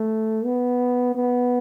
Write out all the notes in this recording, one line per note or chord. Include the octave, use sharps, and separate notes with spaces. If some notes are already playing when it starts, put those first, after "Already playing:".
Already playing: A3
B3
B3